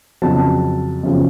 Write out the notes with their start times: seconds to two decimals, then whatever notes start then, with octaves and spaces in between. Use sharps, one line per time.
0.22 F2 C#3 F#3 A5
1.03 F#2 C#3 F3